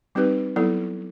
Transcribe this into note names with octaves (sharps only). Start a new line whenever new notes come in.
G3 C4 D#4 G4 B4
F#3 B3 E4 A4